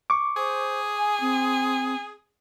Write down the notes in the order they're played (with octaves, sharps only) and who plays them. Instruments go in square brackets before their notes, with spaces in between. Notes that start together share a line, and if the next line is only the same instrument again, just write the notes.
[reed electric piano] C#6 D6
[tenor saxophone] G#4 [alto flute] C5
[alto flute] G#5
C4